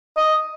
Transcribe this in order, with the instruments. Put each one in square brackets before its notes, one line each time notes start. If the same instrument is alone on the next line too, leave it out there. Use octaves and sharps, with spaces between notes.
[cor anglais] D#5